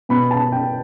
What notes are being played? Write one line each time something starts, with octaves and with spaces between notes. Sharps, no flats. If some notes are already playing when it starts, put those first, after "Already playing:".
B2 B3 B5
A5
G5